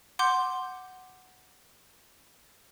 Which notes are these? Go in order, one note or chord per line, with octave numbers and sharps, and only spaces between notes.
F#5 C6 D6 G6